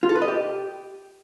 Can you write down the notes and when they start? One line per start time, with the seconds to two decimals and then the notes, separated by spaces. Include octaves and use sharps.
0.03 F4
0.09 A4
0.15 B4
0.22 D#5
0.28 G4